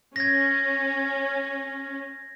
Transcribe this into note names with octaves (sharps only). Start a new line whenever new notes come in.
C#4 G#6 A#6